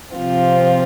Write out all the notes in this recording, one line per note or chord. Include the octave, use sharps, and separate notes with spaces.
C3 F3 C4 F4